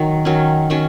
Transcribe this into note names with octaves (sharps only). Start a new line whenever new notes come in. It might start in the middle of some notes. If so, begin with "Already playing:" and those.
Already playing: D#3 F#3
D#3 F#3 C#4
D#3 F#3 C#4